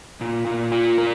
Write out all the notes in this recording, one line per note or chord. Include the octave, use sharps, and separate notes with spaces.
A#2
A#2
F4
A#4